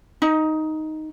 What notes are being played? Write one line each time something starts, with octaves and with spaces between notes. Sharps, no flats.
D#4